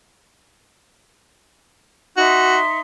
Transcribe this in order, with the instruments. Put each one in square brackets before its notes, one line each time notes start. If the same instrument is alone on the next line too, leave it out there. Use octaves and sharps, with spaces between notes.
[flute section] D#4 E5 C6 [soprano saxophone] F#4